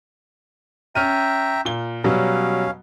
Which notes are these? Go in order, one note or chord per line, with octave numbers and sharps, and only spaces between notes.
C#4 E5 G5 A#5 F6 D#7
A#2 G7
B2 F#3 G3 C#4 F5